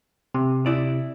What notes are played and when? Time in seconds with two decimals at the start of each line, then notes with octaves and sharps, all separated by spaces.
0.35 C3
0.66 E4 D5